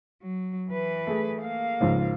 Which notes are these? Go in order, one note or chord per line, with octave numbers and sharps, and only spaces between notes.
F#3
E3 B4
A3 G#4
A#3 F5
C#2 G#2 F3